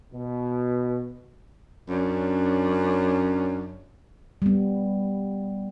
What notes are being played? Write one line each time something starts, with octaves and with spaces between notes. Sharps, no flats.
B2
F#2 C#4 D4
G3 B3